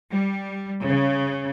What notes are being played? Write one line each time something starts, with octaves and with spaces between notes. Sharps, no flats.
G3
C#3